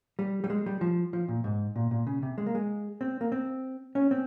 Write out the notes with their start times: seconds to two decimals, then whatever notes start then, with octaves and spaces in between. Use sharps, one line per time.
0.19 G3
0.44 G3
0.50 G#3
0.66 G3
0.81 F3
1.13 F3
1.28 A#2
1.44 G#2
1.76 A#2
1.91 A#2
2.07 C#3
2.23 C3
2.38 G#3
2.46 A#3
2.55 G#3
3.01 C4
3.21 A#3
3.32 C4
3.95 C#4
4.11 C4